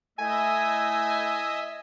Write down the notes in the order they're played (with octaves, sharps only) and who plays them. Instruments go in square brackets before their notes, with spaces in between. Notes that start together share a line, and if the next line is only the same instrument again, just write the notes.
[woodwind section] A3 E4 [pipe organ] D#5 E5 [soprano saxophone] G#5